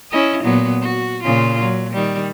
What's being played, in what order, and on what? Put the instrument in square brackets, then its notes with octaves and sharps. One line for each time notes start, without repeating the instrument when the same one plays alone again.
[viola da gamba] C#4 E4 D#5
A#2 F#3 B3
F#4
A#2 C#3 F4
F#3
D#3 G3